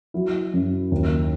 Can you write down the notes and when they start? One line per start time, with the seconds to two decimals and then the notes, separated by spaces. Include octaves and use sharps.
0.14 F#3 E4
0.54 F#2
0.92 D#2